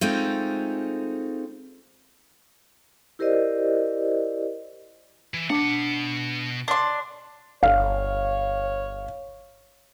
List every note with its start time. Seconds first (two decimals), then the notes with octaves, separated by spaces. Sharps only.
0.01 G#3 A3 C4 D#4 F4
3.19 E4 G4 A#4 C5 D5 D#5
5.34 E3
5.50 B2 D4 F#5
6.68 D4 C6
7.63 G1 C#5 F5